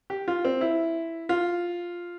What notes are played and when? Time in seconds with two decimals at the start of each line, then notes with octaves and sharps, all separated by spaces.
0.10 G4
0.28 F4
0.45 C4
0.61 E4
1.29 F4